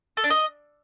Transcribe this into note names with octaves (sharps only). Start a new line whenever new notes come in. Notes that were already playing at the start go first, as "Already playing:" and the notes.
A4
D4
D#5